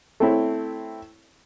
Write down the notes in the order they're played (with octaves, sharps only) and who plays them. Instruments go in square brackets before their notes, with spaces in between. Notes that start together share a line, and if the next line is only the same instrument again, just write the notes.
[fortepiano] A3 C4 E4 C#5